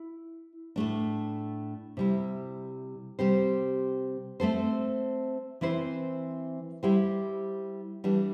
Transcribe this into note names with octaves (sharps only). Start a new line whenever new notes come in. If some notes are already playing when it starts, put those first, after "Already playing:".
Already playing: E4
A2 A3 D4
C3 G3 E4
C3 G3 C4 G4 C5
A3 C4 A4 C5
E3 C4 E4 C5
G3 E4 G4 C5
E3 G3 D4